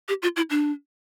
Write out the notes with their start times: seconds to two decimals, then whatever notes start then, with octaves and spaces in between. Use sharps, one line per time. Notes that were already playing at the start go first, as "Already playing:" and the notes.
0.08 G4
0.23 F4
0.36 E4
0.50 D4